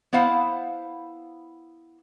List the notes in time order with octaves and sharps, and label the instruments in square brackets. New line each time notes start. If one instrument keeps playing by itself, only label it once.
[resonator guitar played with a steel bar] B3 E4 C5 F5 F#5